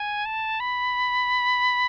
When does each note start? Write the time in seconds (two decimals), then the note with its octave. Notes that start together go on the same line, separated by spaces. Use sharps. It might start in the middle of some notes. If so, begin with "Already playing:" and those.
Already playing: G#5
0.25 A5
0.60 B5